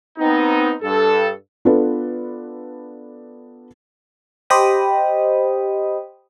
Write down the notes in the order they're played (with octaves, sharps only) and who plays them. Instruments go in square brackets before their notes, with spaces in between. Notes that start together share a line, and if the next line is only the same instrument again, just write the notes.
[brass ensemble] B3 C4 D#4
G2 A4
[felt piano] B3 D4 F4 A4 B4
[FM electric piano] G4 C5 D#5 G5 B5 D#6